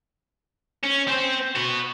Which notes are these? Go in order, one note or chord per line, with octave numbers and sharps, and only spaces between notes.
C#4
C4 C5
F#4 B4